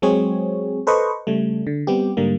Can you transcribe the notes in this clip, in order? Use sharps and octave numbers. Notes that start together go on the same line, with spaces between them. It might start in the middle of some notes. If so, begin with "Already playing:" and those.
F#3 G#3 C4 G#4 C#5
A4 B4 C5 D#5 C#6
C#3 G3 A3
D3
G3 B3 C4 G4
G#2 D3 G3 A#3